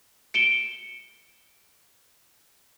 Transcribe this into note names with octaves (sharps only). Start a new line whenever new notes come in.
C#7 D7 E7 G7